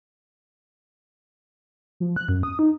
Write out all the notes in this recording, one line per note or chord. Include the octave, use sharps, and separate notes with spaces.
F3
F#6
F#2
D#6
D#4